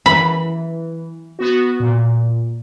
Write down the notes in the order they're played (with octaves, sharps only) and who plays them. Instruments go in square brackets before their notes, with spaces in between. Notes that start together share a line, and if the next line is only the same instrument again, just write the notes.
[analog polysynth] E3 [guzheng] B5
[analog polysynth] B3 F#4
A#2